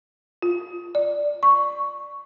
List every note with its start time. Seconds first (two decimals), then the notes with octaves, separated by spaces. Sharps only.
0.42 F4
0.95 D5
1.43 C#6